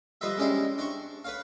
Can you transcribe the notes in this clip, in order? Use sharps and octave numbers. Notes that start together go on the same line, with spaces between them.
F3 G3 B4 C5 D#5 E5
G#3 C#4 D4 E4 G4 C5
D4 C5 C#6
B4 C#5 F5